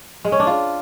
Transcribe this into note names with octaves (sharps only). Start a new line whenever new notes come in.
G#3
C#4
D4
F4